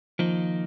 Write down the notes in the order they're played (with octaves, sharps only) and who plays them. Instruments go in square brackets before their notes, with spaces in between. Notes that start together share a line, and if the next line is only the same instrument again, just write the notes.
[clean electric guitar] D#3 A#3 D#4 [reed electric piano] F3